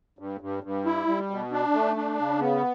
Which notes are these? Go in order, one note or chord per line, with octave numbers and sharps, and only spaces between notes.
G2
G2
G2
E4
G3
B2
D4
A3
D4
C#3
B3